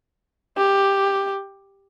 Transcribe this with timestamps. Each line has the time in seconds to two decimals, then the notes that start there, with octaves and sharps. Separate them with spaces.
0.57 G4